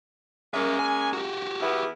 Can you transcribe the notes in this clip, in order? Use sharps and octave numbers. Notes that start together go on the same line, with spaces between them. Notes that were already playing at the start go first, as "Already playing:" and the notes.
G#3 A#3 C#4 A#4 E5
G#5
F#4 G4
E2 B3 E4